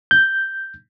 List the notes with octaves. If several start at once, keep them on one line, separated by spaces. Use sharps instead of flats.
G6